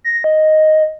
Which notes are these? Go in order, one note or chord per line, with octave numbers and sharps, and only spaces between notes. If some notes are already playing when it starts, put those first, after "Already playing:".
A#6
D#5